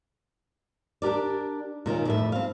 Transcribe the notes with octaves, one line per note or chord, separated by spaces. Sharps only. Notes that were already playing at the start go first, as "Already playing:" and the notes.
D4 G4 A#4 D5
A#2 D#3 C#4 F4
F2 A2 E5
C4 F5